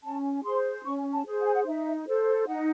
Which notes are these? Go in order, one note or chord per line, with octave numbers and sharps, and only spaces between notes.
C#4 A5
G#4 C5 C6
C#4 C#6
A5
G#4 C5
F#5
G#5
F#5
D#4 E5
A4 C5
D#4 F#5